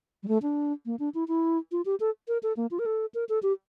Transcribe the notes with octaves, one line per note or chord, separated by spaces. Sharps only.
G3
A3
D4
A#3
D4
E4
E4
F4
G4
A4
A#4
A4
A#3
F4
A#4
A4
A#4
A4
G4